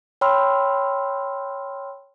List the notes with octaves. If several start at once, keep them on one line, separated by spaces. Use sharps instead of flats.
C#5 G5 B5 C6 E6 F6